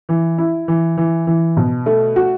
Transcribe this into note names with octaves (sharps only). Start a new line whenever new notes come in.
E3
E4
E3
E3
E3
B2
A3
F#4